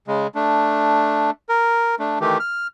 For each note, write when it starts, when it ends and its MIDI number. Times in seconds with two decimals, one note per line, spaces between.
0.08 0.27 49
0.08 0.27 56
0.35 1.31 57
0.35 1.31 62
1.49 1.95 70
1.99 2.18 57
1.99 2.18 62
2.20 2.38 51
2.20 2.38 52
2.20 2.38 57
2.20 2.38 67
2.40 2.67 89